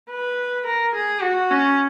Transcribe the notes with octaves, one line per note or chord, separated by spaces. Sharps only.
B4
A#4
G#4
F#4
C#4